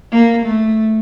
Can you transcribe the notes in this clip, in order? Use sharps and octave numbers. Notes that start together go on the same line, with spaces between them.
A#3
A3